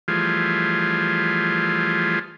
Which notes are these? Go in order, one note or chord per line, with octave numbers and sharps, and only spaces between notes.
E3 F3 G3 A3 F4 G#4